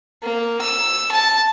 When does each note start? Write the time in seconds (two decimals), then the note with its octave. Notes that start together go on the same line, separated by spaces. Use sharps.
0.22 A#3
0.61 E6
1.11 A5